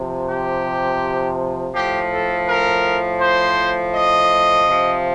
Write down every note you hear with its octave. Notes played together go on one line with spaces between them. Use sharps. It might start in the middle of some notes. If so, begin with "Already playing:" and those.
Already playing: C3 F3
G4
A2 F3 G4
A4
A#4
C5
D#5
C3 F3